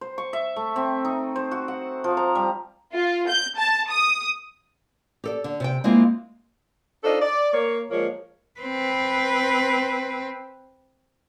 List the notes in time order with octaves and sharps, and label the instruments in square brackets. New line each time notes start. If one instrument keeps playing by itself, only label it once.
[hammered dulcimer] C5
C#6
E5
A3
C4
D#4
C5
F#4
F#5
F3
A#5
G3
[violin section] F4
G6
A5
D#6
[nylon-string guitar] G4 A4 D5
D3
C3 D5 G5
G#3 A#3 C4 E4 F4
[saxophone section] D4 D#4 F4 A4 C5 D#5
D5
A#3 C#5
A#2 F3 G#3 A#3 C#5
[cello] C4 B4